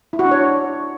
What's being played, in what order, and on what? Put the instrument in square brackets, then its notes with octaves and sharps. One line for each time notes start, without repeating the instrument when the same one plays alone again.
[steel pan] E4
F#4
D4
C#5